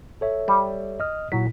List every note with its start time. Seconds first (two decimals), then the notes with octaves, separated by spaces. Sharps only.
0.21 A4 C#5 E5
0.48 G3
1.00 D#5 D#6 F6
1.32 A#2 F#3 E4 B6